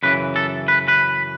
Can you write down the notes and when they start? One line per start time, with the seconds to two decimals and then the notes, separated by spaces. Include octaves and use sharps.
0.03 F#2 C#3 E3 B4
0.36 A4
0.68 B4
0.88 B4